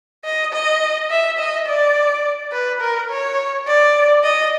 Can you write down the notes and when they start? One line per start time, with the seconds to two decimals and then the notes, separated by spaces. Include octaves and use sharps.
0.25 D#5
0.52 D#5
1.10 E5
1.38 D#5
1.66 D5
2.52 B4
2.80 A#4
3.10 C#5
3.67 D5
4.24 D#5